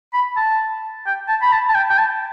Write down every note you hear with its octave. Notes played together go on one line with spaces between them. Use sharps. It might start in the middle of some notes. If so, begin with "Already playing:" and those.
B5
A5
G5
A5
B5
A5
A5
G5
G5
A5